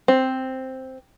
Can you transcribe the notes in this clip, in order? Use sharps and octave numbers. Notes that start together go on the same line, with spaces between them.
C4